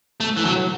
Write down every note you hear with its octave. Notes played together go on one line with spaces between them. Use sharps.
A3
E3
F#3